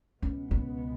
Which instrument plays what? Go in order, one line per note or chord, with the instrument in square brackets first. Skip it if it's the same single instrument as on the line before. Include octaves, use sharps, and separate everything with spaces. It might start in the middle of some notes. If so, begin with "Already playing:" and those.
[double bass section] C#2 B2 G#3 B3 [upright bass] C#4
[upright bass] C#4